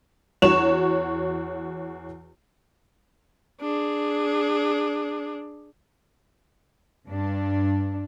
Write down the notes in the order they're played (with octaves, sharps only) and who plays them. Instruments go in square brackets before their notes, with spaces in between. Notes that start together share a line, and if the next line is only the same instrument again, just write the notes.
[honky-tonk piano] E2 F#4 C#5 C#6 E7 F7
[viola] D4 G#4
[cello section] G2 D4